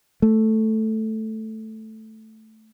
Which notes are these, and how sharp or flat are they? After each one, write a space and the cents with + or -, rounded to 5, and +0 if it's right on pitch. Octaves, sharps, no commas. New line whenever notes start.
A3 +0